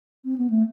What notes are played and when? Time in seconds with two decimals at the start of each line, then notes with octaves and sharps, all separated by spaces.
0.25 C4
0.38 B3
0.50 A3